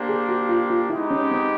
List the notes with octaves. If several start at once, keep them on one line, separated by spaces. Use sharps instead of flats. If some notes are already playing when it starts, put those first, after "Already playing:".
Already playing: A#3 D4 G4 C5
G#4
F#4
F4
F4
G#3 B3 D#4 E4 G4
C#4
C4